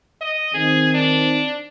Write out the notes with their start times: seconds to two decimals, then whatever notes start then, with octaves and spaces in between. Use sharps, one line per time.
0.21 D#5
0.54 D#3 C4 G#4
0.94 D4